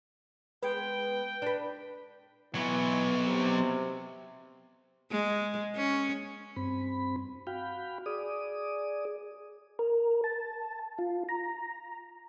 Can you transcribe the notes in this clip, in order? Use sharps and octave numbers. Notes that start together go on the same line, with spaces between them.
G#3 B3 B4 G5
D4 B4
E3 F#3 B3
C3
G#3
C#4
G2 C4 B5
F#4 F5 G5 B5
G#4 D5 D#6
A#4
A5
F4
A#5